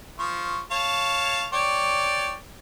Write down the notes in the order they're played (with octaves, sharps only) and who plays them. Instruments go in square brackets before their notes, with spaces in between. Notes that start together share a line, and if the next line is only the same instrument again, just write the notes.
[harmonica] F3 C#6
C#5 F5 A5
C#5 D5 G5